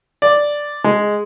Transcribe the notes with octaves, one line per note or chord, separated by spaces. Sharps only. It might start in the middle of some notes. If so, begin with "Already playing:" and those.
D5
G#3